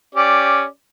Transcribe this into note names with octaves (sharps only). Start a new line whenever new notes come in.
C#4 G4 D5